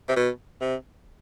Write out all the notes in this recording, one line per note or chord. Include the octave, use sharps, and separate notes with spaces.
C3
B2
C3